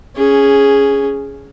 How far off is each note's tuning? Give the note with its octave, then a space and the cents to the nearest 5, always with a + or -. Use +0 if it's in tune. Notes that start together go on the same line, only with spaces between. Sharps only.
C#4 +10 G#4 +0